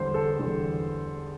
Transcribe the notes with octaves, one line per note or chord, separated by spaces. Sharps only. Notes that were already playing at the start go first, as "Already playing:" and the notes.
Already playing: E2 D3 G3 C5
A4
E2 D3 G3